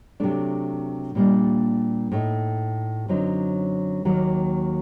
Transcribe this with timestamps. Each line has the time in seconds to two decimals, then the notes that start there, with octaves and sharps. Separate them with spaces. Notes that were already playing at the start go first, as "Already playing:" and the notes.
0.20 C3 F#3 A3 D4
1.15 A#2 G3 A#3 D4
2.12 A2 A3 D#4
3.08 F#2 D3 F#3 C4 D#4
4.05 D#2 D#3 F#3 A#3